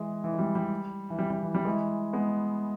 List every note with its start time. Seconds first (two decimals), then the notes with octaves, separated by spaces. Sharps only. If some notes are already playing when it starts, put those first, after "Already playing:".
Already playing: E3 G#3
0.24 E3
0.34 G#3
0.39 G3
0.55 G3
1.10 E3
1.19 G3
1.30 G3
1.42 E3
1.55 G3
1.65 E3 G#3
2.13 G#3 B3